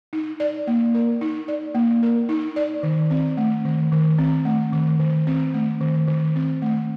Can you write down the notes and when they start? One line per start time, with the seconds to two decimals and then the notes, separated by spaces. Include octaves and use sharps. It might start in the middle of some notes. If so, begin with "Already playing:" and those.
0.13 D#4
0.40 D5
0.67 A#3
0.95 A#4
1.21 D#4
1.48 D5
1.75 A#3
2.03 A#4
2.29 D#4
2.56 D5
2.83 D#3
3.11 C4
3.37 A3
3.65 D#3
3.92 D#3
4.19 C4
4.45 A3
4.73 D#3
4.99 D#3
5.27 C4
5.54 A3
5.81 D#3
6.07 D#3
6.36 C4
6.62 A3